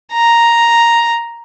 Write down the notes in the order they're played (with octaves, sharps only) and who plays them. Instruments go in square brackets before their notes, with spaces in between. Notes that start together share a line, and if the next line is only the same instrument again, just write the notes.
[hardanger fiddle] A#5